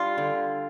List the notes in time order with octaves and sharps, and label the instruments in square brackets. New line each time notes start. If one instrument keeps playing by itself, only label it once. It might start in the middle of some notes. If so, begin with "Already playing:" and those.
Already playing: [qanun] G3 D4 [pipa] F4
[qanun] D3